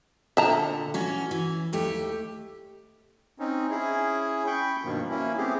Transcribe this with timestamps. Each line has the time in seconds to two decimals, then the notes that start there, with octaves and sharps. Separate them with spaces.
0.37 A#2 D3 E5 A5 A#5
0.94 E3 C#4 F#4
1.31 E3
1.73 D#2 A3 G4
3.39 C4 C#4 D#4
3.70 C#4 E4 G#4
4.47 G5 B5 C#6 G6
4.85 G2 B2 D#3 F3 A#3
5.10 A#3 C#4 E4
5.37 A3 B3 C4 G4 G#4